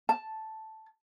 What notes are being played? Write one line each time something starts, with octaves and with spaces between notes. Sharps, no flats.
A5